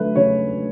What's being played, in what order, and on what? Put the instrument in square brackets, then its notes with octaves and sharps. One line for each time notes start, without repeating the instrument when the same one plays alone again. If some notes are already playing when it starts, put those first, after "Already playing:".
Already playing: [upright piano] D3 F#3 A3 B4
C#3 C#5